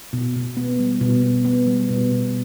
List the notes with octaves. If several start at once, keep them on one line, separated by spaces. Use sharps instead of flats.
B2
B2
B3
G3
B2
B2
B3
G3
B2
B2